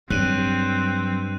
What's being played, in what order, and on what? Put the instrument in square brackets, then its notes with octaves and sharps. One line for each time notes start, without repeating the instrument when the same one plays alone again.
[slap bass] G2 [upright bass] F#3 [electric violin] C4 [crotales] F#6 D#7